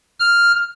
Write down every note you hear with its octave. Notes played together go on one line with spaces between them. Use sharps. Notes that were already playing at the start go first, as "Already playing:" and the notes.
F6